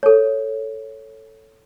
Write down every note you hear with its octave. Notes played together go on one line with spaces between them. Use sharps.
A4 C#5